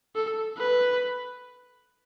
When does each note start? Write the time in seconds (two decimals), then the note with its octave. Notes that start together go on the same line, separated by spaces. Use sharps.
0.16 A4
0.58 B4